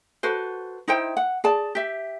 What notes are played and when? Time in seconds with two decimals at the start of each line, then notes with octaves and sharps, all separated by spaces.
0.23 F#4 A4 B4 C5
0.88 D#4 E4 C5 G5
1.17 F#5
1.44 G#4 D5 A5
1.75 G4 E5